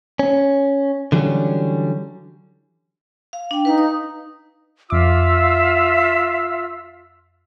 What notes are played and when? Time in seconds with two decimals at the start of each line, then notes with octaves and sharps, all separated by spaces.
0.19 C#4
1.12 D3 E3 F#3 G3 C#4
3.33 F5
3.51 D4 G5
3.65 D#4 B4 F5
3.78 D#6
4.90 F2 F4 E5 F5 D6 E6